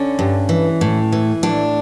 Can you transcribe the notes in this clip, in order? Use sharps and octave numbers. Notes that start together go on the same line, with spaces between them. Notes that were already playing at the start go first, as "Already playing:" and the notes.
Already playing: D3 C#4
G2
E3
A2
E3
A2 D4